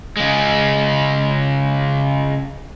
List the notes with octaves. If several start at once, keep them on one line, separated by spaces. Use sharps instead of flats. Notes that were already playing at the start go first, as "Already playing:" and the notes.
C#3 G#3